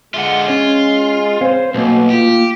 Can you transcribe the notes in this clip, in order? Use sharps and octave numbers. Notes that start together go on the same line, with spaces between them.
D3 G#3 F4 E5 F#5
C#4 F4 C#5
C4 C5 C#5 F5
B1 B2 A3 A#3
F4 G4